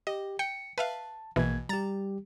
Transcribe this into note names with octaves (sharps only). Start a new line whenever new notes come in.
G4 D#5
G5 C#7
B4 E5 F5 A5
A#1 B2 E3 A#3 G#6
G3 G4 A#5 A6